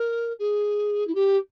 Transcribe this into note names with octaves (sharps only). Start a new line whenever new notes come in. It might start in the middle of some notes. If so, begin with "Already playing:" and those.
Already playing: A#4
G#4
E4
G4